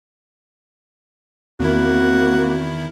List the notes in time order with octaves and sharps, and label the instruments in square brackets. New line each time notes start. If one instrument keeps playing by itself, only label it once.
[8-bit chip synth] E2 D#3 E4 [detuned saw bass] A#3 [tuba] C4 [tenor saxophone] F#4